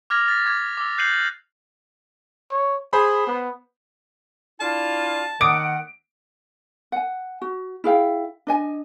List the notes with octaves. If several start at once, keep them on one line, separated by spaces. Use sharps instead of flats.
D6 F6 G#6 A#6 F7
A6 B6
D6 G#6
D6 E6
F#6 G6 C7 C#7 D#7 F#7
C#5
G#4 C5 B5
B3
D4 E4 F4 A5
D#3 F#5 D6 D#6 D7
F#5 G#5
F#4
E4 G#4 F5 G5
D4 D#5 G#5